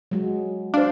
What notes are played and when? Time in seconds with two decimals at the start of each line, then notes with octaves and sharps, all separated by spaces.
0.11 F#3 G#3 F#4
0.74 D4 C5 F5